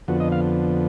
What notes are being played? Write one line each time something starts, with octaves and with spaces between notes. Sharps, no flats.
F2 D3 F3 B3 F#4
D#5
F5